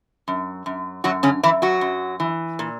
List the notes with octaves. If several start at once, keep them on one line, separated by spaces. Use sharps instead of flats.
F#2
F#2
F#2 F#3 F#4
C#3 C#4
F#2 E3 E4
F#3 F#4
F#2
E3
A#2